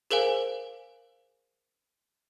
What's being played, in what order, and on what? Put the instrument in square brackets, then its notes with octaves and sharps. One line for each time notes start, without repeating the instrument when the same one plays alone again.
[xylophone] G#4 A#4 C5 F5 G#5